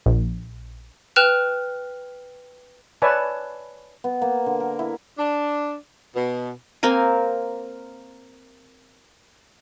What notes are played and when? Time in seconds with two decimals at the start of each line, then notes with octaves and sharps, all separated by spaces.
0.06 A#1
1.16 B4 G5 F6 F#6 E7 F7
3.02 B4 C#5 D5 E5 G#5 A5
4.04 B3
4.22 A#3
4.46 D3
4.60 A#4
4.79 E4
5.17 D4
6.14 B2
6.83 A#3 C4 A#4 G#5